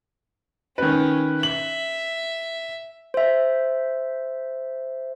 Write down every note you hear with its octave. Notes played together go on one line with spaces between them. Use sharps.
D#3 C#4 B4
E5 F#7
C5 E5